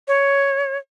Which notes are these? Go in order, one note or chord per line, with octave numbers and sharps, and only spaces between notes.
C#5